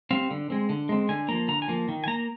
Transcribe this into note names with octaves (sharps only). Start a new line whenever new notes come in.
G3 C4 F5
D3
G#3 C4
D3
G#3 C4
D3 G#5
F3 A#3 A#5
D3 A#5
G#5
F3 A#3
D#3
G#5
A#3 A#5